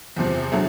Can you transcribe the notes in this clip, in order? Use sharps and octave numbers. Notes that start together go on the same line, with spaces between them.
E2 C3 F3
D3 F#3 A3